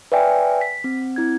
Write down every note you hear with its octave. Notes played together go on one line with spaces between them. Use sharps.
B4 D5 E5 G5 G#5
B6
C4
C4 E4 G#6